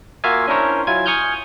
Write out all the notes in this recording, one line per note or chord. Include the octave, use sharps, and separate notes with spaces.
A#3 F4 F#4 E5 F5 G#5
C#4 D4 E4 A#4 C5 C#5
F#3 E4 F4 G#5 G#6
G#5 C#6 D#6 F6 G6